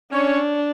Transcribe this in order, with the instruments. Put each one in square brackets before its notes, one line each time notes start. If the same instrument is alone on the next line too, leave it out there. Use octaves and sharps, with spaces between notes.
[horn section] C#4 C#5 [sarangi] D4